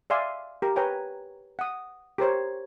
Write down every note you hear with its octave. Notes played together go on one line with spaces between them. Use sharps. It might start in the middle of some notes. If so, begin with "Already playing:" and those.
D5 E5 F5 G#5 C6
G4 A#4
B4 C#5 G5 G#5 A#5
F#5 D#6
G4 A#4 C5 C#5